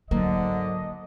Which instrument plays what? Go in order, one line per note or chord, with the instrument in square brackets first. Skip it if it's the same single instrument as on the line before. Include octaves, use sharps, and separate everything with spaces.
[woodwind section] G#2 D3 [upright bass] F#3 D#4 [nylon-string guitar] A#3 [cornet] D#5